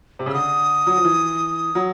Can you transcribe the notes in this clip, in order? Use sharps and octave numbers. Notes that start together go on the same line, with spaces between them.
C3
C#3
E6
D3 D#6
F#3
F3
E3
F#3